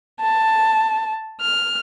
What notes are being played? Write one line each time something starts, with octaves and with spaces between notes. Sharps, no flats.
A5
F6